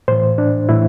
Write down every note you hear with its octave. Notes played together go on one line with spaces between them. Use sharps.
A2 E3 C5
D4
A2 E3 E4